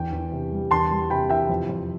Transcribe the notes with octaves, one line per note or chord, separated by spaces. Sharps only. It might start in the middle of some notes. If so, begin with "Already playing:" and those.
Already playing: E2 G5
E2
C3
G3
E2 A5 C6
G3
C3 G5 B5
E3 E5 G5
F2
F2